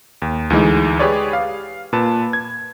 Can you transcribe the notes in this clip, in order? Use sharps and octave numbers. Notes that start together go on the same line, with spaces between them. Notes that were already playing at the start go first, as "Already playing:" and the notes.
D#2
D2 E3 G#3 D#4
G4 G#4 B4 C#5 D5
F5
A#2 B4 A5
G#6